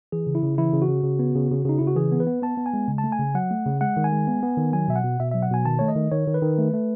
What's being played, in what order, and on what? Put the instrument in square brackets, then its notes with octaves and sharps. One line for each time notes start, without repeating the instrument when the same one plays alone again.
[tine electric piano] E3 G#4
C#3
E4
C#3
E3 E4
C#3
F#4
C#3
C#3
B3
C#3
C#3
C#3 D#4
C#3 E4
F#4
E3 G#4
B3
B4
B3
B3 A5
B3
G#5
G#3
C#3
A5
A3
G#5
C#3
F#3 F#5
A3
C#3
G#3 F#5
D#3
G#5
G#3
B3
B3
D#3
F#3 G#5
B2 E5
F#5
B2
B2 E5
F#3 E5
F#5
B2 G#5
D#3 A5
A3 C#5
D#5
D#3
D#3 C#5
D#3
B4
D#3
A3
A3